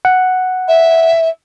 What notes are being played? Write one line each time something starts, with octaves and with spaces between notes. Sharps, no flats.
F#5
E5